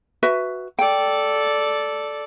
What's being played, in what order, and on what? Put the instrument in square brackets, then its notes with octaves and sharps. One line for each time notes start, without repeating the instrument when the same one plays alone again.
[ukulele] F#4 B4 E5
[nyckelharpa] A4 D5 [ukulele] G5